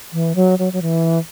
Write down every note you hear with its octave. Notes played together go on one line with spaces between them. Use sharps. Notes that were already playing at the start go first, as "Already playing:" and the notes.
E3
F#3
F#3
F#3
E3